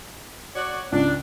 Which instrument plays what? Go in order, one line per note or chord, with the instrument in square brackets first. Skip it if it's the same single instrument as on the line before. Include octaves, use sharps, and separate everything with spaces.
[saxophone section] F#4 C#5 D5
[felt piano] C#2 [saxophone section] D4